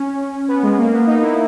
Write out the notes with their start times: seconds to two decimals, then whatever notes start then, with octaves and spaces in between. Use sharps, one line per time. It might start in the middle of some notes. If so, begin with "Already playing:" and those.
Already playing: C#4
0.48 B3
0.63 G#3
0.78 A#3
0.93 B3
1.07 D#4
1.22 E4